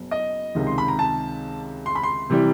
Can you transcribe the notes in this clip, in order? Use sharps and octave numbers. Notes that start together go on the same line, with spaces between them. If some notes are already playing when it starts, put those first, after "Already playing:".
Already playing: F#1 B2
D#5
C#2 C3 D#3
C6
B5
A#5
A5
C6
B5
C6
C3 E3 G3